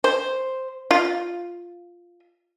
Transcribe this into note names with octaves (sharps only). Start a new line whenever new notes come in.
C5
F4